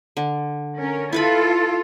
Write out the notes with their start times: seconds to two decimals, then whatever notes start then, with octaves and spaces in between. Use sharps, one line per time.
0.17 D3
0.79 C#4 A#4
1.12 E4 F4 A4 B4 B5